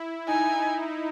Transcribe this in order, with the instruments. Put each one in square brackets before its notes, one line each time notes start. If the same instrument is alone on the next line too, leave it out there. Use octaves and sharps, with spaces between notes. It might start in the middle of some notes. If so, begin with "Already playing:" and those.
Already playing: [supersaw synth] E4
[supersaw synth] D#4 [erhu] G#5